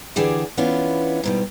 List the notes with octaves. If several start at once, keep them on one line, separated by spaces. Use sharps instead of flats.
D3 E3 D4 G4 G#4 D5
E3 B3 C#4 D4 F4
G#2 B2 G3